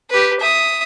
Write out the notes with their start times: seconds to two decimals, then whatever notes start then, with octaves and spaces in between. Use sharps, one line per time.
0.10 G4 B4
0.40 E5 D#6